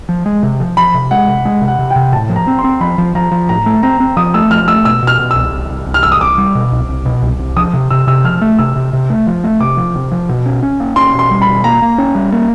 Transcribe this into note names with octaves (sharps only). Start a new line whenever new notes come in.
F3
G#3
C3
F3
F3 B5
C3
G#3 F#5
C3
G#3
C3
F#5
C3
G5
C3
A2 A5
F3
A#5
C4
C6
C4
F3 B5
F3
F3 A#5
F3
A2 A#5
A3
C4 A#5
C4
F3 D#6
A3 E6
F3 F6
A3 E6
B2 E6
B2 F6
B2
E6
C2
C2
C2
C2
F6
C2 E6
D#6
C2 D6
G3
B2
C2
C2
B2
C2
C2
F3 D#6
C3
C3 E6
C3 E6
F3 F6
A3
C3 E6
C3
C3
A3
F3
A3
C3 D6
F3
C3
F3
B2
C#4
C#4
A#3
C#4 C6
B2
C6
G3
B5
B2
A#3 A#5
A#3
C#4
G3
A#3